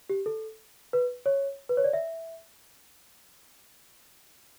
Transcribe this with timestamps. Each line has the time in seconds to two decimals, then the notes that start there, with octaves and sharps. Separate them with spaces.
0.09 G4
0.26 A4
0.93 B4
1.26 C#5
1.69 B4
1.77 C#5
1.84 D5
1.93 E5